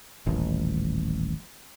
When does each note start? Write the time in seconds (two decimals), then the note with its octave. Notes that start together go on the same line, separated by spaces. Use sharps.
0.26 D#1 A1